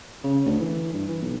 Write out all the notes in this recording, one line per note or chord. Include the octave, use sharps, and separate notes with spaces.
C#3
D2
E3
G2
E3
B1